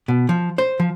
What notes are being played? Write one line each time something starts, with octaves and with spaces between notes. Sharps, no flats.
B2
F3
C5
F3